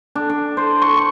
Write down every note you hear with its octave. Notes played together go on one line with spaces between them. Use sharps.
D4
D4
C5
C#6
C#6